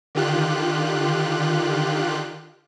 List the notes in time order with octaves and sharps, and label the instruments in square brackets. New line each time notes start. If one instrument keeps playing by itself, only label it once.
[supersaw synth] D3 D#3 F4 G4 F#6